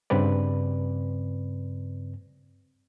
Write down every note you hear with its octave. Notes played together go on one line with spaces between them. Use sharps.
G2 C#3 C4 B4 D5